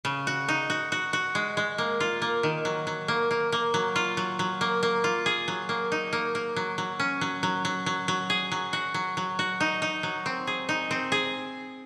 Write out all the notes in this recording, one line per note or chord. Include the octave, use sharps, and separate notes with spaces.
C#3
F#4
D#4
F#4
F#4
F#4
G#3
G#3
A#3
F4
A#3
D#3
F#3
F#3
A#3
A#3
A#3
F#3
F4
F#3
F#3
A#3
A#3
F4
G#4
F#3
A#3
D#4
A#3
A#3
F#3
F#3
C#4
F#3
F#3
F#3
F#3
F#3
G#4
F#3
F#4
F#3
F#3
F#4
D#4
D#4
F#3
C4
G#4
D#4
C4
G#4